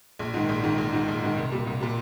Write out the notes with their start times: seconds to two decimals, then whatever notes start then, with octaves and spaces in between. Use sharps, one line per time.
0.19 A#1
0.34 G#2 D#3
0.49 A#1
0.63 G#2 D#3
0.78 A#1
0.93 G#2 D#3
1.08 A#1
1.23 G#2 D#3
1.37 C2
1.52 A#2 G3
1.67 C2
1.81 A#2 G3